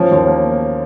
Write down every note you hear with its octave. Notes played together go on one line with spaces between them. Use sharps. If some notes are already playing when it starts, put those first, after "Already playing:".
Already playing: F3 C#4
D#2
A#3